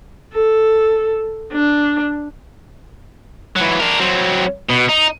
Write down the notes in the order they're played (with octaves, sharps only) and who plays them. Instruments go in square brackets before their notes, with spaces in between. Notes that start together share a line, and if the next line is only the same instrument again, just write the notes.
[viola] A4
D4
[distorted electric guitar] E3 F#3
D4 A#4
F#3 C4
B2
D#4